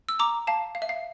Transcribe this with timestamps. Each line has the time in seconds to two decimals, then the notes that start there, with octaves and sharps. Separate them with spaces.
0.09 E6
0.19 A#5 D6
0.47 F5 A5
0.75 F5
0.82 E5
0.89 F5